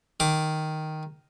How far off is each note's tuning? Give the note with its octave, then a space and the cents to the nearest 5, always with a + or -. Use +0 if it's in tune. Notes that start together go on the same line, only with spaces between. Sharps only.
D#3 +0 D6 +0